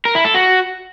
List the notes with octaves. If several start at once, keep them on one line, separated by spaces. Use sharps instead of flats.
A#4
E4
A4
F#4